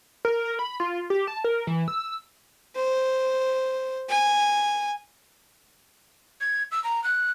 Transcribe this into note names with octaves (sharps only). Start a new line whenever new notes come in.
A#4
A#4
B5
F4
G4
A5
A#4
E3
E6
C5
G#5
G#6
E6
A#5
F#6